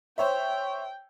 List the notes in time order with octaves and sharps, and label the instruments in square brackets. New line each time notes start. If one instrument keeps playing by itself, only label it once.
[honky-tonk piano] C5 C#5 E5 [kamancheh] G5